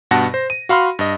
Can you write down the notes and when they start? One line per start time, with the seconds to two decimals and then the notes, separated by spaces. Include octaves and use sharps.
0.11 G2 B2 F#5 A5 A#6
0.34 C5
0.50 D#7
0.69 F#4 F5 B5 C6 F6
0.99 G2 D#5